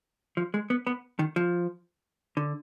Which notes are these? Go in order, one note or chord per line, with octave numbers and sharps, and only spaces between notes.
F3
G#3
B3
B3
D#3
F3
D3